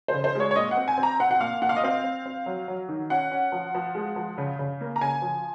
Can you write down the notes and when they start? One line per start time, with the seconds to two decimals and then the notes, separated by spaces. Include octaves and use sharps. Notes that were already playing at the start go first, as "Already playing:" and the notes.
0.08 C5
0.14 C#3
0.24 C5
0.35 G#3 C#5
0.51 C#5
0.56 A#2 D#5
0.71 F#5
0.77 C4
0.88 G#5
0.98 C4
1.03 A#5
1.20 C4 F#5
1.31 F#5
1.40 A#2 F5
1.62 A#2 F#5
1.69 F5
1.76 D#5
1.83 C4 F5
2.04 C4
2.26 C4
2.46 F#3
2.68 F#3
2.89 D#3
3.10 C#4 F#5
3.32 C#4
3.52 F3
3.75 F3
3.95 G#3
4.16 F3
4.38 C#3
4.59 C#3
4.81 A#3
4.96 A#5
5.01 C#3 G#5
5.22 F3